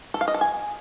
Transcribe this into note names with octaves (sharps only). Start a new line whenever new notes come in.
A4
F5
D#5
A4
G#5